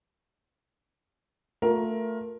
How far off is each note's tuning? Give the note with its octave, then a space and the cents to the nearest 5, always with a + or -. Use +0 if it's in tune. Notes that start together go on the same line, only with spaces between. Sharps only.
A3 +20 F4 +35 A#4 +15